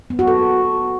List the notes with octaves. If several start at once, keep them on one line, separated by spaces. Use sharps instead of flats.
B3
F#4
A4